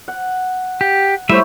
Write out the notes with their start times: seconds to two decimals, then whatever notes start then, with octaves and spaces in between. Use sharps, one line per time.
0.08 F#5
0.81 G4
1.29 G3 A3 E4 C5 C#5 E5